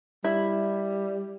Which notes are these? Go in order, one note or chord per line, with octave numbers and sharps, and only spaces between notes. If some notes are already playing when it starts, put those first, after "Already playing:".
G3 E4